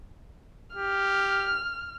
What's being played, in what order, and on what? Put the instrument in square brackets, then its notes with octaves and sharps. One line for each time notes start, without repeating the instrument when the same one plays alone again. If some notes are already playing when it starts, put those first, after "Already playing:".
[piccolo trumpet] G4 [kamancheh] F6